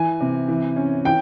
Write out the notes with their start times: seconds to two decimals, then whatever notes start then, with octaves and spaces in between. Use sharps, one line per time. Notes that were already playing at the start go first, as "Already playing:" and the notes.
Already playing: E3 G#5
0.21 C3
0.48 E3
0.76 C#4
1.05 E3 G5